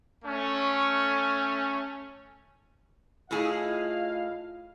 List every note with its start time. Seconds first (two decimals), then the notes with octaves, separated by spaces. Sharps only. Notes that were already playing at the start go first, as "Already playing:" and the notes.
0.24 A3 C#4
3.31 A2 E4 F4 G#4 D#5 F5